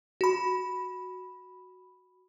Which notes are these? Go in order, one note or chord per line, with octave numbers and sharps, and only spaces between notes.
F#4 B5